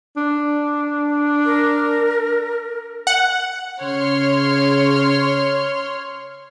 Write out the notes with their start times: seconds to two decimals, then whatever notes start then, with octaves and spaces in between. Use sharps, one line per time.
0.16 D4
1.45 A#4
3.07 F#5
3.82 C#3 C#5 C6 F6